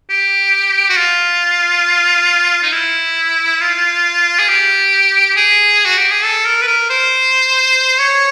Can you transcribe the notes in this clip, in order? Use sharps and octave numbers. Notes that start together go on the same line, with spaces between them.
G4
F#4
F4
D#4
E4
F4
G#4
G4
G#4
F#4
G4
G#4
A4
A#4
B4
A#4
C5
C#5